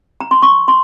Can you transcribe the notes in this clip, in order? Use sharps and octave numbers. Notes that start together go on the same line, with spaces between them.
A#5
C6
C#6
C6